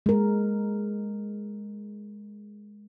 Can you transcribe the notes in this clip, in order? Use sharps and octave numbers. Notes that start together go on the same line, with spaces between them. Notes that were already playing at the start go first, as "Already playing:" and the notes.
G#3 A#4